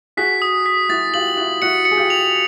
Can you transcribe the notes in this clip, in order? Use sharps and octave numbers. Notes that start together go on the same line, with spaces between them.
F#4 G#4 B6
D#6
B6
E4 F#4 A6
F4 G4 F#7
E4 F#4 F#7
E4 F#4 C#7
C#7
G#4
F4 G4
F7